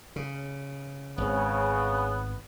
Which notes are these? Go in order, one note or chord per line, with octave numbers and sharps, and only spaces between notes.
C#3
G#1 C#3 B3